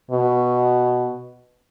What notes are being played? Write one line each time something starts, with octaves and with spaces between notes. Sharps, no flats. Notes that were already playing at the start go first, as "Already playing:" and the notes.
B2